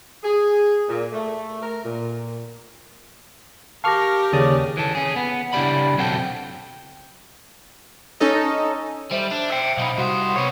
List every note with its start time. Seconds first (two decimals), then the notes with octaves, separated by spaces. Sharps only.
0.23 G#4
0.88 A#2
1.13 A3
1.63 A#4
1.85 A#2
3.84 G4 A#4 F5 A5 C#6 D6 F6 A#6
4.32 D#2 C#3 D5 D#6
4.77 E3 A4
4.95 C#4 G#4
5.16 B3
5.53 C#3 D4 E4 G4 D5 B5
5.98 B1 F#3 C4 F#4 A4 G5
8.20 C#4 D#4 A4 D#5
9.12 G3 C5 E5
9.32 D4
9.51 C5 E5 G5
9.77 B1 D#4 F5 B5
9.98 C2 F#4 C5 F#5 D#6
10.36 B3 C#5